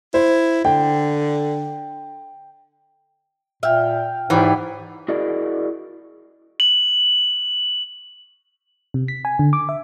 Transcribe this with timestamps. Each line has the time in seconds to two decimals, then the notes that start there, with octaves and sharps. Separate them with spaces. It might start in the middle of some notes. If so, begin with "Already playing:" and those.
0.14 E4 C5
0.65 D3 G5
3.63 A#2 E5 F5 G5
4.30 G#2 E3 F#3 G3 G4
5.08 E4 F#4 G#4 A#4 D5 D#5
6.60 F#7
8.94 C3
9.08 B6
9.25 G#5
9.39 D3
9.53 D6
9.69 E5